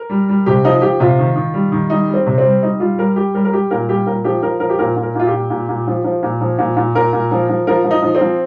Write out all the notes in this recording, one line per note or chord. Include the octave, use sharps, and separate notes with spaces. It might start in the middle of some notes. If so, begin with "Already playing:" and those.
Already playing: A#4
G3
G3
C3 G4
F3 D#4
F3 G4
C3 F4
D#3
D#3
G3
D#3
G3 D#4
G3
C4
C3
C4
G3
G3 D#4
G3 F4
G3 A#4
G3 G4
G3 A#4
A#4
G3 G4
A#2 A#4
G3 G4
A#2 A#4
F3 G4
F3 A#4
F3 A#4
G4
A#2 A#4
A#2
A#4
A#2 F4
G4
A#2
A#2
A#2
F3
F3
A#2
F3
A#2
A#2
A#2 A#4
A#2
F3
F3
F3 A#4
F3
D#4
F3
C4
F3